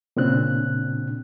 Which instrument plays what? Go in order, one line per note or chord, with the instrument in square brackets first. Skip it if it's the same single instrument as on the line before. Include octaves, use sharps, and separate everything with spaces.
[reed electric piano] A#2 C#3 C4 D4 F#6